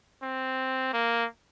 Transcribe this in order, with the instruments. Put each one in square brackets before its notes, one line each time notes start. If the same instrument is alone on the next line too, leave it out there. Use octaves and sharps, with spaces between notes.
[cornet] C4
A#3